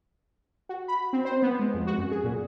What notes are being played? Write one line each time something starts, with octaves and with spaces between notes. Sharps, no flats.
F#4
B5
C4
C5
B3
G#3
F2
F#4
F#2
G#4
A#2